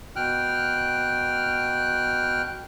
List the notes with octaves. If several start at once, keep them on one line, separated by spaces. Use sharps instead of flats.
B2 G5 F6 F#6